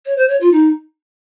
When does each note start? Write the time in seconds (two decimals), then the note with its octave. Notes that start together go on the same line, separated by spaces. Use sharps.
0.05 C#5
0.16 C5
0.28 C#5
0.40 F4
0.51 D#4